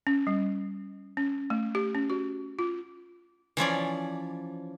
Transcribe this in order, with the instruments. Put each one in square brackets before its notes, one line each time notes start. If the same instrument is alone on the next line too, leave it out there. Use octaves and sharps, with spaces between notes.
[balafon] C#4
G3
C#4
A3
G4
C#4
F#4
F4
[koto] E3 F3 C#4 D5